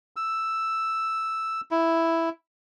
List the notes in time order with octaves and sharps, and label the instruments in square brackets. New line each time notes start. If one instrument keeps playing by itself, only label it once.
[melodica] E6
E4